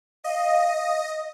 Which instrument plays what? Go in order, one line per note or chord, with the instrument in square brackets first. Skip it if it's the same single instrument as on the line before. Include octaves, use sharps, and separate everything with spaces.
[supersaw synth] D#5 [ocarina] F5